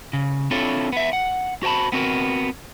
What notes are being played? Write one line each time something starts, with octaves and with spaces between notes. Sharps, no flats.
C#3
C4 D4 E4 F4 A4 C#5
B3 E5
F#5
F#4 C5 G5 A5 B5
B3 C4 F#4 A#4